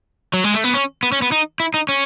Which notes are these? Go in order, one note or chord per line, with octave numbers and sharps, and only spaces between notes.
F#3
G#3
A3
B3
C#4
B3
C#4
B3
D#4
E4
D#4
C#4